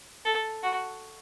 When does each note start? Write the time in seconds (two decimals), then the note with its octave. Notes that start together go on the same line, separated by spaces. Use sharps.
0.25 A4
0.63 F#4